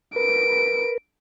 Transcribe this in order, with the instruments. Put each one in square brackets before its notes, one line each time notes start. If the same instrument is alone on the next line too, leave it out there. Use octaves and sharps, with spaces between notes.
[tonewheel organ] A#4 B4 [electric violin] D7